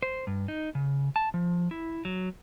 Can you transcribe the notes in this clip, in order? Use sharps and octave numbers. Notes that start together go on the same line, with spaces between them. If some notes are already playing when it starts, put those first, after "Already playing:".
C5
G2
D#4
C#3
A5
F3
E4
F#3